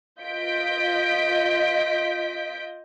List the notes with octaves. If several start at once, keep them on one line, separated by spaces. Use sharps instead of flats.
F4 D#5 G6 B6 D7